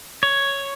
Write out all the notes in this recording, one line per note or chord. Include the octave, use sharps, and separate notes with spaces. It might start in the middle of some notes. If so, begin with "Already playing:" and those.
C#5